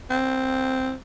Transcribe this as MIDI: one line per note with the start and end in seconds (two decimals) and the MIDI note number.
0.10 0.94 60